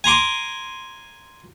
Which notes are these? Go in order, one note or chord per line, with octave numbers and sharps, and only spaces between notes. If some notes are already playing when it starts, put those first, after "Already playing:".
G#5 A#5 C6 D6